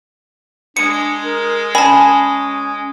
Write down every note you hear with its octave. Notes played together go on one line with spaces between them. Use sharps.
G#3 D4 C#7
A#4
C#4 G#5 A5 B5